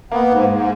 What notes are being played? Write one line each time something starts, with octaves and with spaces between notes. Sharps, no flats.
A#3 B3
G#2
G#2